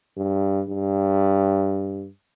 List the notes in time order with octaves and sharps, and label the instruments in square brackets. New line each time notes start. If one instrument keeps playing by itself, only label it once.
[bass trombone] G2
G2